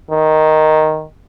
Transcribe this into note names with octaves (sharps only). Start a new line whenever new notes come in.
D#3